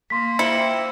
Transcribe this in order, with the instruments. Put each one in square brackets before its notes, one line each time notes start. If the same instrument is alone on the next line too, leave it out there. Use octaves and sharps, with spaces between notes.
[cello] A#3 [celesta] C6 B6
[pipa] E4 [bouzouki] F4 C5 G5 [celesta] C#7